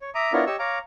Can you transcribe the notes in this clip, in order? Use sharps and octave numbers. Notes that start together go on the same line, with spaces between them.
C#5
E5 A#5 D6 D#6
B3 D4 E4 F4 A#4 C#5
G4 C#5 D#5 C#6 E6
C#5 F5 A#5 D6